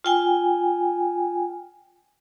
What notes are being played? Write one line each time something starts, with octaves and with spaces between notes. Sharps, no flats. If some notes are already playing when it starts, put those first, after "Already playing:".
F4 G5 G#5